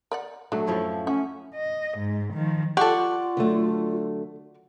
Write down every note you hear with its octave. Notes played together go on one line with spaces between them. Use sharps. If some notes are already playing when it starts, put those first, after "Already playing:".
A#4 D5 F#5
F#3 A3 D4
F#2 A2 F3 E4 A4
C#4 E5 F#5
D#5
G#2
D#3 F3
F4 G4 A4 D5 F#5 C#6
D3 F#3 A3